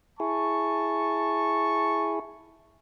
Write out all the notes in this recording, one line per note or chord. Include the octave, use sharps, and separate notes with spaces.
E4 G#4 A5 C#6